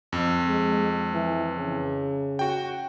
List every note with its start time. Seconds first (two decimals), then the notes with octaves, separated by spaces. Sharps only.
0.12 F2
0.47 G#3
1.14 E3
1.56 C#3
2.39 F#4 G5